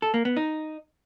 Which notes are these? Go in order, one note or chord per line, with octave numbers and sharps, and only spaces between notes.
A4
A#3
B3
D#4